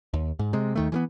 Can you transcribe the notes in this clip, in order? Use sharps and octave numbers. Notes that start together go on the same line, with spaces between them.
D#2
G#2
C3 G#3
D#2 D#3 A3
E3 G3 B3